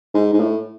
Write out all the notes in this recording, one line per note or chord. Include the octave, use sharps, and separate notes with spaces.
G#2
G#2
A2